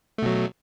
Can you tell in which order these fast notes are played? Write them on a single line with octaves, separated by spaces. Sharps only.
A3 B2 F#3